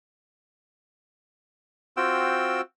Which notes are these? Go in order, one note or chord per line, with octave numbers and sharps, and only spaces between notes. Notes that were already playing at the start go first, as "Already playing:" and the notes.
C4 F4 F#4 G5 E6